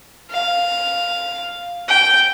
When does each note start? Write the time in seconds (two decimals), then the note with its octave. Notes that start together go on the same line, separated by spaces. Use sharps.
0.31 F5
1.88 G5